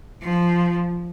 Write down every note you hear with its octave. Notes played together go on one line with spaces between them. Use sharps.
F3